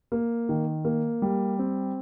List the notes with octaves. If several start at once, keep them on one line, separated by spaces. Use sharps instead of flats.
A#3
D#3
A#3
G3
C4